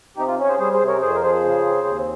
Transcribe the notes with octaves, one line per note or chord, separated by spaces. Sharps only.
C3 D#4 G4
F4
C#4
C#5
G#4 C5
G3 G#4 C5
G#4 C5
C3
A#4 C#5
F2 G#4 C5
A#4
F3 G#4 C5
C#3
C4
D#2